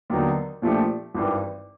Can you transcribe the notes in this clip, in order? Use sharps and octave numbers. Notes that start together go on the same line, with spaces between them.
D#2 D3 F#3 B3 D#4
A#2 F3 A3 D4 G4
G#1 G2 E3